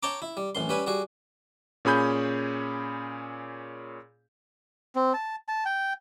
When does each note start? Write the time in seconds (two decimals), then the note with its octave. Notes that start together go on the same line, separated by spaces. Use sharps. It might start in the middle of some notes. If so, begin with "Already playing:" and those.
0.03 C#5 G5 A5 A#5 D6
0.22 E4
0.37 G3
0.55 A1 F#2 C6
0.69 G3 C#4 B4 G#5
0.87 G3 F#4 G#4
1.85 A#2 C#4 G#4 B5 G6
4.95 C4
5.14 A5
5.48 A5
5.65 G5